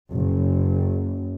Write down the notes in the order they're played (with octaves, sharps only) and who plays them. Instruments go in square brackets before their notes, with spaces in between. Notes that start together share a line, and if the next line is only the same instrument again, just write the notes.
[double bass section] F#1